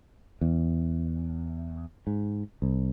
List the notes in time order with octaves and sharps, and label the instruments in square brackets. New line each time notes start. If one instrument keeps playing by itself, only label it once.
[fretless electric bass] E2
G#2
C2